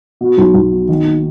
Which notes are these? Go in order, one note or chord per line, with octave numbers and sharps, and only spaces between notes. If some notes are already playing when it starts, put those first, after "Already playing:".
B2
B1
B1
B2
D#3
A#3